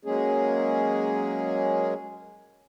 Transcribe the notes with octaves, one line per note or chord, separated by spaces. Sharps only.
F#3 G#3 A#3 C#4 G#4